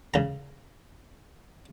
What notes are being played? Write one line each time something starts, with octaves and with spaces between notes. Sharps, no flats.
C#3 A#5